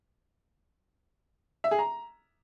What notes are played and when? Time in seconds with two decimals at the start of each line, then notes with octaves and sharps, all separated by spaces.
1.64 E5
1.71 G#4
1.79 A#5